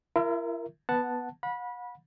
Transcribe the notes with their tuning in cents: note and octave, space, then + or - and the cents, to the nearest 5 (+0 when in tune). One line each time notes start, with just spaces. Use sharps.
E4 +45 A#4 +0 E5 +0
B3 +0 F#5 +0 A5 +0
F#5 -40 B5 -20